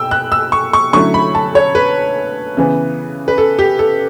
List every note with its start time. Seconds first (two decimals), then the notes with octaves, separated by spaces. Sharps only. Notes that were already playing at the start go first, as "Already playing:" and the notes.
Already playing: B2 G5 E6
0.11 F#6
0.32 E6
0.52 C#6
0.73 C#6
0.93 D3 F#3 A3 C#4 E4 C#6
1.14 B5
1.35 A5
1.55 C#5
1.75 B4
2.57 C#3 E3 B3
3.28 B4
3.38 A4
3.59 G4
3.79 A4